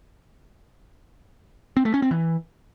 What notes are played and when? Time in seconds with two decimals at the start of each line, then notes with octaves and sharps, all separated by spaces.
1.77 C4
1.85 A3
1.94 C#4
2.02 C4
2.11 E3